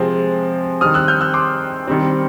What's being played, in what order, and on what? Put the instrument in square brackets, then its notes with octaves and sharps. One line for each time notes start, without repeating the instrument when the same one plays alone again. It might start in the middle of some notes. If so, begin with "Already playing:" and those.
Already playing: [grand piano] C3 F3 G#3 C4
D#3 G3 C4 D#6 F6
E6 F#6
F6 G6
E6 F#6
C6 D6
D#3 G3 C4